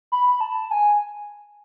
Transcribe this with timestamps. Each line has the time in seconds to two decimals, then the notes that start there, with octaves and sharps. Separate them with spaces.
0.12 B5
0.41 A5
0.71 G#5